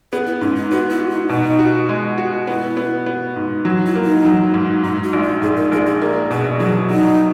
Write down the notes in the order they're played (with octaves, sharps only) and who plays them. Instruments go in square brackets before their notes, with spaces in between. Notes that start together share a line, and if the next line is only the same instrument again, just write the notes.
[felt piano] B3 [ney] G#4
[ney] E4
[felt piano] G#2 [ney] C#4
[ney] D#4
[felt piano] B3 [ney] F#4
[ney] E4
[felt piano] F#4
[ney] D#4
[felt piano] B2 [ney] D#4
[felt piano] F#4
G#3
F#4
[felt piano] B3 [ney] E4
[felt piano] B3
B3
G#2
F#3
[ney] E4
[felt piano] A#3
[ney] D#4
[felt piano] F#3
G#2
[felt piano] G#2 [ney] D#4
[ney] F#4
[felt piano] A#1
[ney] F#4
[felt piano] G#2 [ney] G#4
[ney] A#4
[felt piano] A#1 [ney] G#4
[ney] G#4
[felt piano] A#3 [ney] G#4
[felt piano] B2 [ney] G#4
[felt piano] F#3 [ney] G#4
[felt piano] F#3 [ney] D#4